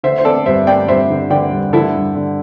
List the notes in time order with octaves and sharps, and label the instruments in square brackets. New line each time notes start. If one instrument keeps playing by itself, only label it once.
[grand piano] D3 [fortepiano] C5 E5
[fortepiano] C5
[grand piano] C4 [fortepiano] A4 D5
[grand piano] G2 [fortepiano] C5 E5
[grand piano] C4 [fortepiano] D5 G5
[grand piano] G2 [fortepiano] C5 E5
[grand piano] D3
[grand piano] D3 [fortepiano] D5 G5
[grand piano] G2
[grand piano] D3 [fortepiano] E4 A4
[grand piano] G2
D3